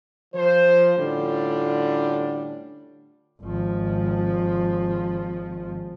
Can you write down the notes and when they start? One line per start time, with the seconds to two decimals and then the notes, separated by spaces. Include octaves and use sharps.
0.35 F3 C5
0.98 A2 D3 G3 C#4 D4 F4
3.42 G#1 F3